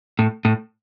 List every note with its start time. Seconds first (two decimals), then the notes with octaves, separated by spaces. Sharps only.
0.19 A2
0.45 A2